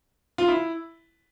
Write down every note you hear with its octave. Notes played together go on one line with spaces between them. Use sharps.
F4
E4